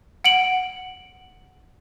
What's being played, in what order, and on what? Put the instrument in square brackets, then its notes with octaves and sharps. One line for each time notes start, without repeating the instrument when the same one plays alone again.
[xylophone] F#5 D7 F#7